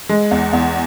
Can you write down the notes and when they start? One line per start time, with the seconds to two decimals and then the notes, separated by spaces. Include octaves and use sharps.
0.09 G#3
0.31 E2
0.53 E2